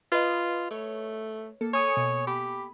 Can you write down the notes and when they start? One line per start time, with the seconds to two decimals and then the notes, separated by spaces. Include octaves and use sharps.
0.12 F4 B4 D#5
0.71 A3 C#5
1.61 A#3 A4
1.74 C#5 G#5 D#6 C#7
1.97 B2
2.27 G4 B5